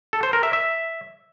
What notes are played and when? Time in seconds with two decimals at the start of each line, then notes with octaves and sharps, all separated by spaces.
0.13 A4
0.23 C5
0.33 A#4
0.43 E5
0.53 E5